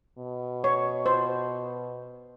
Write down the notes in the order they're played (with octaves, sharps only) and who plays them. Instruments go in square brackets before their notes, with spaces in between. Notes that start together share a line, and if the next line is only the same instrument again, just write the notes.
[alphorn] B2
[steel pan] C#5
C5